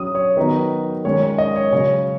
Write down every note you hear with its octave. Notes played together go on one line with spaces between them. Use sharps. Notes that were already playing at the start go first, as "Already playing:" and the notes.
Already playing: F#3 C#4 D#6
C#5
D#3 F#3 B3 D#4 B4
D#3 G#3 C#4 C#5
C#5
D#5
C#5
C#3 F#3 C#4 C#5